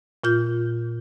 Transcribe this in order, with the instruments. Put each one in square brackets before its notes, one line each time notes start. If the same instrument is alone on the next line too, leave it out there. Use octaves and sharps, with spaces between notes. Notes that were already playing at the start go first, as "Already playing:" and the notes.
[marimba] A#2 F4 G6